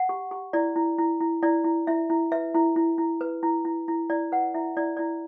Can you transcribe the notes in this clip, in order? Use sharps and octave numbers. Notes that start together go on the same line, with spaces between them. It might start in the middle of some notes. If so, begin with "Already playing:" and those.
Already playing: F#5
G4
G4
E4 D5
E4
E4
E4
E4 D5
E4
E4 E5
E4
B4 E5
E4
E4
E4
B4
E4
E4
E4
E4 D5
B4 F#5
E4 E5
E4 D5
E4 D5